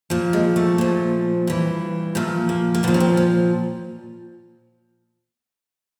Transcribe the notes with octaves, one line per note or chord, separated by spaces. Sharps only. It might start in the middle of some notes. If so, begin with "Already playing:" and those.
A#2 F3
G#3
A3
A#2 F3
G2 E3
A#2 F3 A3
A#3
A#3
A#2 F3 B3
C#4
C4
C#4